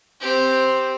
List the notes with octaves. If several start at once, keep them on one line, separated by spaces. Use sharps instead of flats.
C4 G4